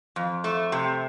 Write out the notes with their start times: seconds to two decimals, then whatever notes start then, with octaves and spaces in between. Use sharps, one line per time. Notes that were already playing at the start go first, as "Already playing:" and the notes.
0.16 F2
0.44 A3
0.72 C3